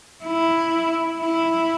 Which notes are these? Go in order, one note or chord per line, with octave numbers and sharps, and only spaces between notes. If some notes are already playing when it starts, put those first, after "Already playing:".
E4
E4